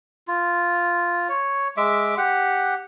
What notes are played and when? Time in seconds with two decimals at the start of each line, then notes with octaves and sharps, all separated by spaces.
0.28 F4
1.29 C#5
1.77 G#3 E5 D6
2.17 G4 F#5